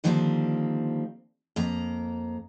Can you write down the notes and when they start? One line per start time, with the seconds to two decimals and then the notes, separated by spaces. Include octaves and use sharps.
0.04 D3 D#3 F3 G3 A#3 C4
1.56 F2 A#3 A#5